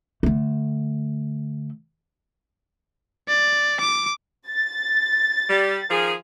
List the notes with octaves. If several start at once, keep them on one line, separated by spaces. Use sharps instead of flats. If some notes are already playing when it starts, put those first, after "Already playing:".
D3 A3
D5
D6
A6
G3
D#3 F3 G#4